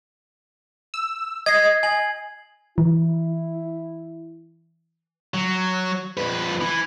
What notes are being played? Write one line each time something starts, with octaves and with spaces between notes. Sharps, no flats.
E6
D#5 G#6 C7
G#5 F#7
E3 E4
F#3
F2 B4
E3